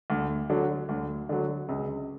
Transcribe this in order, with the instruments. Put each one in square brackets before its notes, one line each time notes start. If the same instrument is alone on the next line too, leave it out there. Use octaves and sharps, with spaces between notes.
[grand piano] D2
D3 F#3
D2
D3 F#3
C#2